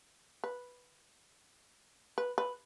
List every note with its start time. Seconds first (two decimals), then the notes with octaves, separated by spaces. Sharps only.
0.44 B4
2.18 B4
2.38 B4